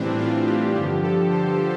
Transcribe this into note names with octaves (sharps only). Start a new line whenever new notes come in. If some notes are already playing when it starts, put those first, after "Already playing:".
Already playing: A2 E3 G3 C4 D4
F4
G4
G2 D3 F3 G4
A4
C5